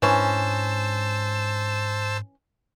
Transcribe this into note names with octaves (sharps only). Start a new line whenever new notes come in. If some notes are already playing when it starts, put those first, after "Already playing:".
G#2 E3 C#4 D4 C5 A5 E6